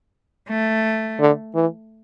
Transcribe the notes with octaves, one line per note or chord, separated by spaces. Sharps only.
A3
D3
E3